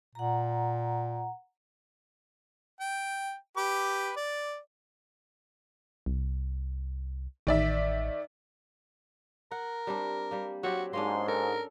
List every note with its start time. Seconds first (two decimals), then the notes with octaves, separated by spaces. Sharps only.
0.15 A#2 F#5 A#5
2.81 G5
3.57 G4 B4 D6
4.16 D5
6.06 C2
7.47 A1 D#3 D5 E5
9.51 A#4 F#5
9.87 G3 C4 D4
10.31 G3 A#3
10.63 F#3 C4 F#4 G4
10.93 G#2 A#3 C#4 D4 C6
11.28 A4 A#4